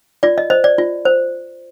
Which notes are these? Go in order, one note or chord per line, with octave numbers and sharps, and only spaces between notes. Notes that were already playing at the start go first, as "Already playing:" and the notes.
F4 D5
D#5
C5 D#5
D5
F4
C5